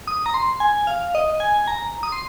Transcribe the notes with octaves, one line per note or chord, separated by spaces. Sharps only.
D#6
A#5
C6
G#5
F5
D#5
G#5
A#5
D#6
C6